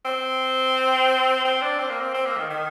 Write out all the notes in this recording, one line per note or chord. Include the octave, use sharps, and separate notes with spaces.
C4
C4
D4
C4
A#3
C4
C4
A#3
D#3
D#3